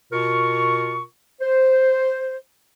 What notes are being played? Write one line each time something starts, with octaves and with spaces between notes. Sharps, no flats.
B2 F4 A#4 C#6
C5